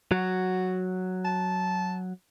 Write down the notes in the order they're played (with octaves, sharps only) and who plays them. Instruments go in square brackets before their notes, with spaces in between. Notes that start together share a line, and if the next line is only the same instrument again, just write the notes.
[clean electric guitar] F#3 [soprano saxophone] F#4
[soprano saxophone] A5